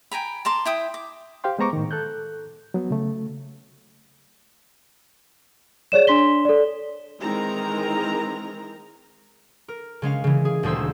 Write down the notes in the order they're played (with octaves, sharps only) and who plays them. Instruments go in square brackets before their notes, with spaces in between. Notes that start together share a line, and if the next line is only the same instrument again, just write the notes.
[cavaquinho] G5 G#5 A#5 B5
A5 A#5 C6 D6
E4 G5 D#6
D6
[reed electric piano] G4 C5 F5 G5 C6
G#3 B3 C5 A#5 C#6 D6
A2 D#3
A4 F#6 G6
F#3 B3
C#3 A3
[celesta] G#4 C#5 D5 E7
D4 C6 B6 G7
A4 D5
[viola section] D#3 E3 G#3 C4 A#4 A#5
[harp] A#4
C#3 G#3 C#4 F5
C#3 E3
G#4
D#1 D2 G#4 C5 E6